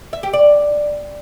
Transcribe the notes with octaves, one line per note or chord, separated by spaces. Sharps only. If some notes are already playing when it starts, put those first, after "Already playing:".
E5
G4
D5